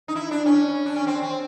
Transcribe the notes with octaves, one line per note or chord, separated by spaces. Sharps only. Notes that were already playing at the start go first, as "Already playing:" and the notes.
D#4
E4
D4
C#4
D4
C#4
C4
C4